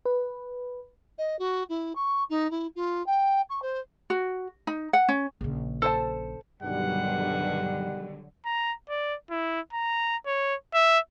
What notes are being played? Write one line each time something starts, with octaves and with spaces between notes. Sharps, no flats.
B4
D#5
F#4
E4
C#6
D#4
E4
F4
G5
C#6
C5
F#4
D#4
F#5
C#4
A#1 C#3
A4 C5 A5
B1 G2 D3 D#3 F#3 G3 F#5
A#5
D5
E4
A#5
C#5
E5